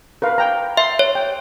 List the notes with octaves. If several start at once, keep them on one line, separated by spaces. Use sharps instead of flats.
A#4 B4 F5
G5 A#5
E5 C6
C#5
G5